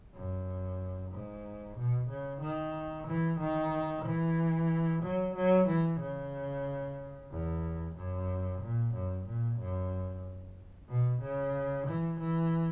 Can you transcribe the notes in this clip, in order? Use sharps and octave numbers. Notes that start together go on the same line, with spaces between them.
F#2
G#2
B2
C#3
D#3
E3
D#3
E3
F#3
F#3
E3
C#3
E2
F#2
A#2
F#2
A#2
F#2
B2
C#3
E3
E3